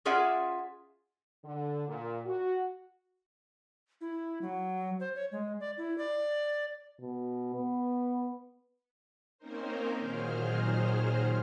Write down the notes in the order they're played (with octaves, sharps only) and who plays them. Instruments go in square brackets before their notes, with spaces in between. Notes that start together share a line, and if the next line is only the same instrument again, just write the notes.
[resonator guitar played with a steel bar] C#4 F4 G#4 D5 E5 F#5
[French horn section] D3
A#2
F#4
[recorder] E4
F#3
C5
C#5
G#3
D5
E4
D5
[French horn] B2
B3
[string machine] A#3 C4 C#4 D#4 A#4 C5
A#2 D#3 F#3 G#4 C5 F6